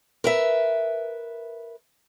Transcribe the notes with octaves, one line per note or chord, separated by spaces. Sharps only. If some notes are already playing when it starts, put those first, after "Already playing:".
A#4 B4 E5